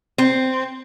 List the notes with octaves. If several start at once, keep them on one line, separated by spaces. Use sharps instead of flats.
C4